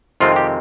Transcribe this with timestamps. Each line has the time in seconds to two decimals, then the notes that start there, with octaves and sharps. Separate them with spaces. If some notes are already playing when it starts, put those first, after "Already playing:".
0.20 F2 C3 D#3 G#3 C4 F4
0.36 G4